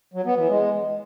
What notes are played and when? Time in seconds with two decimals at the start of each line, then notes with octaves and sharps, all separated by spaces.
0.14 F#3
0.26 B3
0.37 E3
0.49 G#3